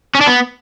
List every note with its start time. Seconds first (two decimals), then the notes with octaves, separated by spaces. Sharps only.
0.15 C#4
0.21 D4
0.27 B3